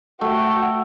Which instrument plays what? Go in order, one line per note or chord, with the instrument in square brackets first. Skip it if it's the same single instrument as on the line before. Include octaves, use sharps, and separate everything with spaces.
[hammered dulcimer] A3 [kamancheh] F#4 G5